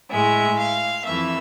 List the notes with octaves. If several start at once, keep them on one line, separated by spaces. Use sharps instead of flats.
A2 G#3 E5
F5
F2 E3 A3 E5